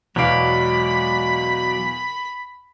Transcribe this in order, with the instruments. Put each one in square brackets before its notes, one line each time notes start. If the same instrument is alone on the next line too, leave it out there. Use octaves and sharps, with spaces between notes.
[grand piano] E2 B2 F5 [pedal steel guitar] F#3 D5 [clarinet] G#3 [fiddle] B5